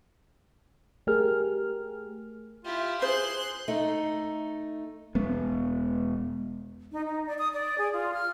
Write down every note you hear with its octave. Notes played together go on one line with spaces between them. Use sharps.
A3 G4 G#4 A#4 F6
E4 F4 G4
G#4 C5 C6 F#6
A3 D#4
E1 G#3 B3
D#4
D#4
D5
D#6
D5
G#4
F4
F6